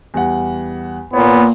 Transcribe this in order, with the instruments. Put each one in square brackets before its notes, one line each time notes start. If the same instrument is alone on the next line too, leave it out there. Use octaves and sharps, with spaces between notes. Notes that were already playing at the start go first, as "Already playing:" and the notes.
[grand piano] E2 G3 F#5
[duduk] A#2 [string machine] A#3 [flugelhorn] B3 [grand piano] C#5